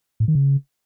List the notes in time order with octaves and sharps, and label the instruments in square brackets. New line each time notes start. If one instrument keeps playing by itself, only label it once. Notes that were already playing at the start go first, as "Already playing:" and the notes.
[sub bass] A2
D#3
C#3